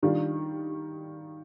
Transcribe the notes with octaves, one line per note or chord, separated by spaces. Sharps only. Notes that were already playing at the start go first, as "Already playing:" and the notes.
D#3 G3 D4 F4